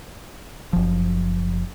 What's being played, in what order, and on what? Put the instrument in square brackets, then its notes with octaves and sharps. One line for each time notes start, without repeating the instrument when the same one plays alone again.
[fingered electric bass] F#1 F3